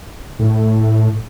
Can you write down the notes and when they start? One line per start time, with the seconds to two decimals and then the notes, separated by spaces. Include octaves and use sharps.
0.39 A2